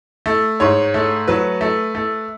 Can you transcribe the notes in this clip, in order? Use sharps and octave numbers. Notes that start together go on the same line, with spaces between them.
A3
G#2 C#5
A3
F#3 B4
A3
A3